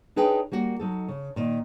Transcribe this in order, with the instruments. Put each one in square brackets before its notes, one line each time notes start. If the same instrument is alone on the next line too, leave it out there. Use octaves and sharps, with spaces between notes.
[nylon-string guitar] D4 D#4 G#4 B4 C#5 G5
G3 A#3 F#4
F#3 D#4 A4
C#3
A#2 D#3